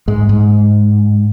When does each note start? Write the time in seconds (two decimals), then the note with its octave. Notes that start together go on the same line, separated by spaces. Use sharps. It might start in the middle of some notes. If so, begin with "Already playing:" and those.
0.08 G#2 G#3
0.29 G#2